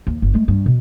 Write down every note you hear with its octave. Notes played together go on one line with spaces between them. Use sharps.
D#2
G1
G#3 A3
G2
B2